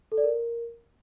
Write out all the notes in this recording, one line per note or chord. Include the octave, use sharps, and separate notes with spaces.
A4
D5
A#4